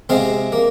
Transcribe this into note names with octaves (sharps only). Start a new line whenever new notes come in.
C3 G#3 C4 F5
A#3